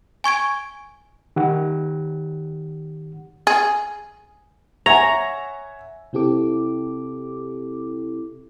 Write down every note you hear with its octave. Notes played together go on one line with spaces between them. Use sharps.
G#5 C#6 G#6 D7
D#3 G4 F#5
G#4
C#5 E5 F#5 G#5 A#5
C3 C4 E4 G4 A4 D6